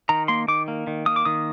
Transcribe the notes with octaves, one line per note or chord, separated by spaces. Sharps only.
D#3 A#5
A#3 C6
D#3 D6
A#3
D#3
A#3 D#6
D6
D#3 D#6